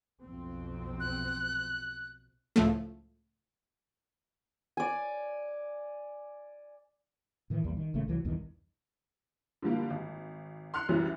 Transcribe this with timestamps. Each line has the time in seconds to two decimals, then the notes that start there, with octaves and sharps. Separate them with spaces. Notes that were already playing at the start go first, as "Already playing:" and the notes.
0.23 B1 F2 C4
1.00 F#6
2.56 C#2 A2 F3 A3
4.77 D5 G#5
7.50 A2 D#3 E3
7.63 A#1 E2 G3
7.77 D#3
7.94 G#1 C#3 A3
8.08 C2 E3 F#3
8.25 B1 E2 G2 D#3
9.62 D3 F3 G3 A#3
9.90 G#1
10.74 C6 F6 F#6 C#7
10.89 C2 F#2 E3 F#3 G3